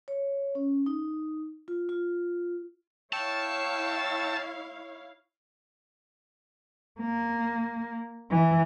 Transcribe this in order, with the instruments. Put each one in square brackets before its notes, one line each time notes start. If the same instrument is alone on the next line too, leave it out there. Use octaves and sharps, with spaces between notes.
[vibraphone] C#5
C#4
D#4
F4
F4
[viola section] E4 C#5 F5 [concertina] G5 C#6 E6 [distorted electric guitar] A5
[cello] A#3
E3